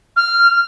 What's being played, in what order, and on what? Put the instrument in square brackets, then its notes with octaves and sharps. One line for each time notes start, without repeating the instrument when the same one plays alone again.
[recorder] F6